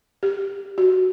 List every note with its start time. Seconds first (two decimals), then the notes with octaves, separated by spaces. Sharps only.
0.23 G4
0.78 F#4